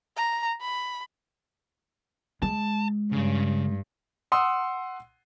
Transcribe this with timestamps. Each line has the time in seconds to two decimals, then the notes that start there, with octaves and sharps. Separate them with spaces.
0.16 A#5
0.61 B5
2.42 G#3 A5
3.12 G2 C#3
4.32 F#5 C6 D#6 E6